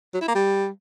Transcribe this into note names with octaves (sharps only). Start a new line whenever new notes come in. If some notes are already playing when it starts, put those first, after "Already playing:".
F#3
E4
A#3
G3